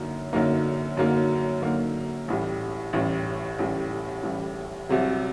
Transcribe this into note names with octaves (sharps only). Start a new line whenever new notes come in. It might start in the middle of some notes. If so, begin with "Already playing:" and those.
Already playing: F#2 D3 F#3 A#3 D#4
F#2 D3 F#3 A#3 D#4
F#2 D3 F#3 A#3 D#4
F#2 D3 F#3 A#3 D#4
A1 A2 G3
A1 A2 G3
A1 A2 G3
A1 A2 G3
C2 C3 F#3